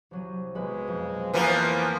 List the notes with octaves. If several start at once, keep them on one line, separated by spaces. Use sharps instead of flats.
C2 F#3 D#7
B1 G#3 B4
F2
E3 F3 A#3 B3